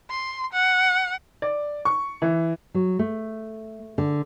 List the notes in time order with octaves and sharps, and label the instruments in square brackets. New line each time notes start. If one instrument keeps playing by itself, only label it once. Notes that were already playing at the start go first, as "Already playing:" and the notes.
[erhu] C6
F#5
[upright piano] D5
C#6
E3
[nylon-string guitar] F#3
A3
D3